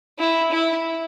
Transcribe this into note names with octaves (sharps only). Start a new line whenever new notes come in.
E4
E4